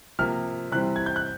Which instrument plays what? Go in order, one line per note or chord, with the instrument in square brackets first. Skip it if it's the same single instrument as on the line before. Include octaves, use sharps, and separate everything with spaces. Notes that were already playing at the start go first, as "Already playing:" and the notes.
[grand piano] C3 F3 A#3 F6
C3 E3 G3 C4 F#6
G#6
G6
F#6